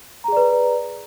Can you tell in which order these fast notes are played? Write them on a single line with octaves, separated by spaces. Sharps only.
A#5 G#4 D5 B4